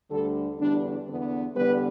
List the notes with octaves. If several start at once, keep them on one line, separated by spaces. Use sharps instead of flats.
D2 D3 G3 A4
E2 D3 G3 D4
E2 D3 B3
E2 D3 G3 B3 B4